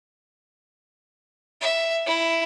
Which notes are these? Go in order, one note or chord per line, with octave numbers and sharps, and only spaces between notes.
E5
E4